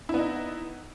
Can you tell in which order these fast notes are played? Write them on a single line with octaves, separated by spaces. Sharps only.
E4 B3 D#4